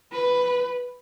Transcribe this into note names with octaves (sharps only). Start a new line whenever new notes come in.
B4